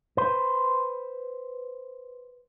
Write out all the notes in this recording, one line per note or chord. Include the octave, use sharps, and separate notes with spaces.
B4 C5